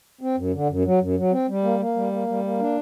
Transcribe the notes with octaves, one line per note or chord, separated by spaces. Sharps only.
C4
F#2
D3
F#2
F#3
F#2
F#3
C4
G3
A#3
A#3
G3
A#3
G3
A#3
D4